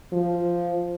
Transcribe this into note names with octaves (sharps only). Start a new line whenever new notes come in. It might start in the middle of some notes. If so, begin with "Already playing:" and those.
F3